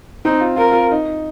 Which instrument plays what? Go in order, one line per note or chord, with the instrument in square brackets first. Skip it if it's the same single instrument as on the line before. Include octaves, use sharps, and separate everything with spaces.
[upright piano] C4 [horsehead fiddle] D#4
[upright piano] F4
[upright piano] F4 [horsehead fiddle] A#4
[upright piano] F4
D#4